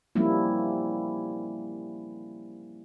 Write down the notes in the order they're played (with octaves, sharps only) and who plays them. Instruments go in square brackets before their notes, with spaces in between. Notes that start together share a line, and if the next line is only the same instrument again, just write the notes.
[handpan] F3 G3 A#3 C4 C#4 E4